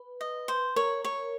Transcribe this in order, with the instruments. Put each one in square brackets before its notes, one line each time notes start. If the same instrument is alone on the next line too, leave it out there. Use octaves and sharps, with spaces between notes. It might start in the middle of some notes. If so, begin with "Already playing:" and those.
Already playing: [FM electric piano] B4
[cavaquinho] D#5
C5
[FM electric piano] A#4 [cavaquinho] C#5
[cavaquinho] C#5